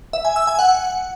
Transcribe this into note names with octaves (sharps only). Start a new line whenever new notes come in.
E5
G#5
E6
G#5
F#5